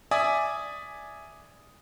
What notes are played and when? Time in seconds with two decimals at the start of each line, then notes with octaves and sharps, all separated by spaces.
0.11 D5 E5 G#5 D#6